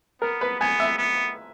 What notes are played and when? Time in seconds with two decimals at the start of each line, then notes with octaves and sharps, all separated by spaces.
0.22 B3 A#4
0.41 B4
0.60 B3 G#5
0.80 E5
0.98 B3